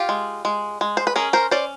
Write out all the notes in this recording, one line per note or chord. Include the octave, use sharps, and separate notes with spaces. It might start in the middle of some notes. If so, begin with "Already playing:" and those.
Already playing: F4 G4
G#3
G#3
G#3
C5
B4
C#4 G#4 A#4
A#4 C5
C#4 C5 D5